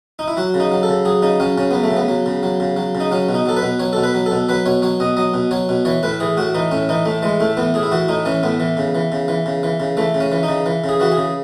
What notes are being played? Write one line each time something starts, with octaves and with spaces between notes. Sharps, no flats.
D#4
E4
F#3 F#4
C#3
D#4
F#3
A4
C#3
F#3 G#4
C#3 D#4
F#3 C#4
C#3 C#4
F#3 B3
A3
C#3
B3
F#3
C#3
F#3
C#3
F#3
C#3
D#4
F#3 C#4
B2
D#4
F#3 A4
B4
B2
F#3 C#5
B2 A4
B4
F#3
A4
B2
F#3 B4
B2 C#5
F#3 C#5
B2 D#5
F#3 D#5
B2
F#3 C#5
B2
E3 C#5
A2 B4
E3 G#4
A2 F#4
E3 D#4
A2 C#4
E3 D#4
A2 A3
E3 G#3
A2 A3
E3 B3
A2 G#4
E4
E3 F#4
A2 D#4
E3 C#4
A2 B3
E3
C#3
E3
C#3
E3
C#3
E3
C#3
E3 A3
C#3
C#4
E3
D#4
C#3
E3
C#3
G#4
E3 F#4
G#4
C#3